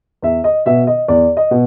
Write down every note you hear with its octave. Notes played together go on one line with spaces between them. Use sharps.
E2 E5
D#5
B2 E5
D#5
E2 D5
D#5
B2